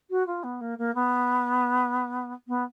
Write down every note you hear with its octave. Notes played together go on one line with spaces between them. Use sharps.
F#4
F4
B3
A#3
A#3
B3
B3